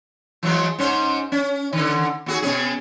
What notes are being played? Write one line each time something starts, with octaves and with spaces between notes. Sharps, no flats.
E3 F#3 G#3
G#2 C#4 C5
C#4
D3 D#3
D#2 F#4 G#4
B2 C#4 G#4